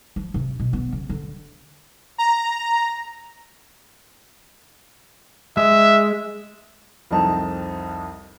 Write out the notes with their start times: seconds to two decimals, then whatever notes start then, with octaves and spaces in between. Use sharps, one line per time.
0.16 F3
0.34 C3
0.60 B2
0.73 B3
0.92 C#3
1.09 D3
2.18 A#5
5.57 G#3 E5
7.11 C2 F2 C4 D#4 A5